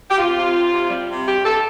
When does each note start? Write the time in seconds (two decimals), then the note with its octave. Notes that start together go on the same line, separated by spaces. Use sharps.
0.10 G4
0.18 C3 F4
0.37 C3
0.55 C3
0.72 C3
0.90 G3
1.09 C3
1.26 G2 G4
1.45 G2 A4